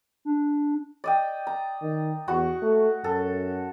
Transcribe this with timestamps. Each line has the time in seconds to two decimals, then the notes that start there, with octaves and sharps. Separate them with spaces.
0.25 D4
1.04 D5 D#5 G5
1.47 A#5
1.82 D#3
2.28 E2 F#4 C#6
2.62 A3
3.04 F#2 A4